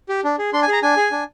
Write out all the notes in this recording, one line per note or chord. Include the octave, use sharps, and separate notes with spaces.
G4
D4
G#4
D4 C6
G#5
G#4 A#5
D4 G#5
G#4
D4